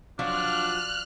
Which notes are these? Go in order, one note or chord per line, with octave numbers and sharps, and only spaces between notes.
F3 F#3 D4 F4 F6 F#6